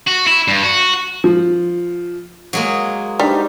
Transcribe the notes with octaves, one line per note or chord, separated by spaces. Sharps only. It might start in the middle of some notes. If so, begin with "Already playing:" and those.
F#4
E4
G2
F#4
F3
F#3 G#3 A#3
G3 D4 D#4 C5